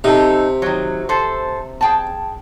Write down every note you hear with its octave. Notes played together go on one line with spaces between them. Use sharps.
C3 D#4 A4
D#3 F#3
A4 C5
G#4 G5 A5